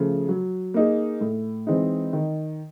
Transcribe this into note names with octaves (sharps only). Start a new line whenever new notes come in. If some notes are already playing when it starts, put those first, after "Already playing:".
Already playing: C#3 F3 A3
F#3
A#3 D#4 G#4
A2
E3 G#3 C4 D#4
D#3